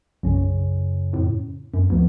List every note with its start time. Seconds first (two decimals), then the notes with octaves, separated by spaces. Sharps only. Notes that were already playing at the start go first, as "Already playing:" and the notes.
0.23 B1 F#2 C#3 C#4
1.13 F2 A2
1.74 F#2
1.90 D2 F3 B3